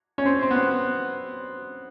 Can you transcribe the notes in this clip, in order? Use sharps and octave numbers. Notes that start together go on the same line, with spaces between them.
C#4
C4
C4
B3